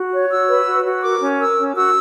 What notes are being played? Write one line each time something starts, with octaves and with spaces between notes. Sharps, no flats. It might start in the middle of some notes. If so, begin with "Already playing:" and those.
Already playing: F#4
C#5
F#4 E6
B4
F#4
F#4
A#4 D6
C#4
A#4 E6
C#4
F#4 E6